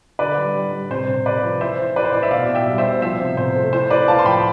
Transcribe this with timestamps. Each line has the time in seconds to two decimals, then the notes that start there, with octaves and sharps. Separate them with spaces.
0.19 D3 B4 D5
0.38 G3
0.56 G3
0.72 G3
0.90 C3 C5
1.08 C3
1.26 C3 B4 D5
1.43 F3
1.60 E3 C5 E5
1.78 A2
1.96 A2 B4 D5
2.05 C5
2.13 A2 D5
2.23 E5
2.31 B2 D5 F5
2.49 B2
2.55 E5 G5
2.67 G3
2.78 C5 E5
2.85 B2
3.02 F3 C5 E5
3.20 C3
3.37 C3 C5
3.56 A3
3.72 A2 C5
3.90 A2 B4 D5
4.08 A2 F5 A5
4.19 C6
4.26 F3 G5 B5